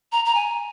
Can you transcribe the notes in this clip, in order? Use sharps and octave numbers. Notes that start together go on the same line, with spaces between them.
A#5
A#5
G#5